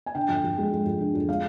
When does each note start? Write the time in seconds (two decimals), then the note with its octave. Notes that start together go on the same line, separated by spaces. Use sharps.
0.06 G#5
0.15 D3 G5
0.29 F2
0.44 F2
0.58 G#3
0.72 F2
0.86 F2
1.01 D3
1.14 F2
1.29 G#3 F5